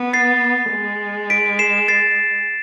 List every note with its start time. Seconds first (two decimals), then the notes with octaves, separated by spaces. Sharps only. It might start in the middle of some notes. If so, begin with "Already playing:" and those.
Already playing: B3
0.13 A6 C7
0.71 G#3
1.30 B6 D7
1.59 C7 E7
1.88 A6 C7